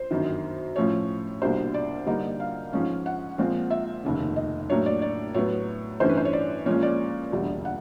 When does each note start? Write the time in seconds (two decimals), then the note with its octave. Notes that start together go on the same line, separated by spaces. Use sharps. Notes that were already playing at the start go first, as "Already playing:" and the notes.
Already playing: C5
0.11 G1 F#2 D#3
0.76 A2 F3 A3 C#4 C#5
1.41 C2 B2 G3 A#3 D4 C5
1.74 D5
2.06 G2 D3 G3 A#3 D#4
2.40 F5
2.73 G#2 F3 G#3 C#4
3.06 F#5
3.38 A#2 F3 G#3 C4 F4
3.70 E5
4.04 F1 D#2 C#3
4.36 D#5
4.69 A2 F#3 A#3 D4 C#5
4.86 D5
5.02 D5
5.34 A2 F#3 B3 C#5
6.00 G1 G2 E3 A3 C#4 C5
6.09 B4
6.17 C5
6.25 C#5
6.33 D5
6.66 A#2 F3 G#3 C#4 C#5
6.82 D5
7.32 E1 D2 D3 G3
7.65 F#5